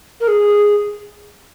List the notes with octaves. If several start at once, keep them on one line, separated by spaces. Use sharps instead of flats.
A#4
G#4